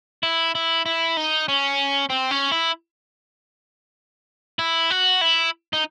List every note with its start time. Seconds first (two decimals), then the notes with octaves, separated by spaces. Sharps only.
0.23 E4
0.55 E4
0.86 E4
1.17 D#4
1.48 C#4
2.10 C4
2.31 C#4
2.52 E4
4.59 E4
4.90 F#4
5.21 E4
5.73 D#4